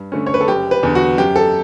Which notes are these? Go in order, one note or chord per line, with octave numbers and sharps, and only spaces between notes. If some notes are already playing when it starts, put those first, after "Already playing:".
Already playing: G2
D3 A3 C#4
C#5
B4
A4
F#1 G4
B4
E2 D3
F#4
F#2 G4
A4